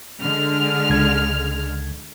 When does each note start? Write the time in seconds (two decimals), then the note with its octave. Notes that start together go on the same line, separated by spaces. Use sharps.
0.22 D3 G#3 F6
0.90 C#2 G#6